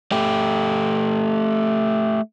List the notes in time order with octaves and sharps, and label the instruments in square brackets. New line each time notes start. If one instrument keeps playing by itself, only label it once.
[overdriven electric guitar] A3 G4